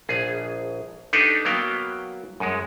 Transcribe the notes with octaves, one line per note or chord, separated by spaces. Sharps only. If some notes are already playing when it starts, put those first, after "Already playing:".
A#1 G#4
D4 D#4 G4 A4 B4
F#3 A#3 B3 F5 G5
F#2 G#3